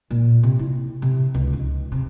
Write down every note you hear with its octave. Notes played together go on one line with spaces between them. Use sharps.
A#2
C3
E4
C3
C#2
G#2
C3